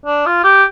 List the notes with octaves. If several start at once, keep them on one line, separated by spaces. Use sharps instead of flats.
D4
F4
G4